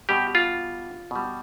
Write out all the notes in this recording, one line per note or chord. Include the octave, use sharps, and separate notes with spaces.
B2 G3 G4
F4
B2 G3